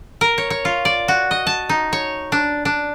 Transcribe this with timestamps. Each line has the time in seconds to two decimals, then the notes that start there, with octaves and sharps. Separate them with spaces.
0.21 A#4
0.38 C#5
0.50 C#5
0.65 F4
0.85 D5
1.08 F#4
1.31 D#5
1.47 A5
1.69 D#4
1.93 C#5
2.32 D4
2.65 D4